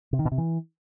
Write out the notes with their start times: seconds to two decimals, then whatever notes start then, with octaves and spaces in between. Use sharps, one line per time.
0.13 C3
0.19 D#3
0.25 B2
0.32 C3
0.38 E3